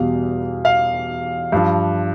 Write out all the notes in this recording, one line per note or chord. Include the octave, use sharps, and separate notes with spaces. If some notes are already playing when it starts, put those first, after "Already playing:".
Already playing: E2 B2 G3 F5
F5
G2 F3